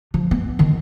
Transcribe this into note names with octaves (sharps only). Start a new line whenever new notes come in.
F3
B3
D#3